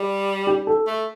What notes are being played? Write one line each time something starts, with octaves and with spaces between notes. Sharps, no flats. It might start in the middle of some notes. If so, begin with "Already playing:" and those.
Already playing: G3
G4
A4
A3